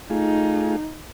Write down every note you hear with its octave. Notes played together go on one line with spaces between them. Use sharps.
A3 D#4 F4 G#4